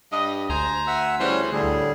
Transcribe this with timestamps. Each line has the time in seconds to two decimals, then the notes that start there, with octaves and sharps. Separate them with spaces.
0.12 G2 D#5
0.49 D2 C5 G#5 A#5
0.87 E5 F#5 E6
1.20 C#3 E3 G3 C#4 C5
1.52 A2 D3 G3 G#4